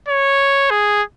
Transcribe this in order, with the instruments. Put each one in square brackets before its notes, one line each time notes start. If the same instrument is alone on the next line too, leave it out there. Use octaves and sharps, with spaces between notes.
[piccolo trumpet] C#5
G#4